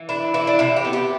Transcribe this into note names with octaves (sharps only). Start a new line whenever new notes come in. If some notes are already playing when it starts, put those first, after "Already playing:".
Already playing: E3
D4 E4
E3 E4
D4
C3 E4
G4
B3
G4